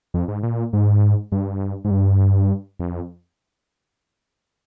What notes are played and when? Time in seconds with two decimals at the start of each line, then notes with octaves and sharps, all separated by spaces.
0.14 F2
0.28 G#2
0.43 A#2
0.73 G#2
1.32 G2
1.85 G#2
1.91 G2
2.80 F2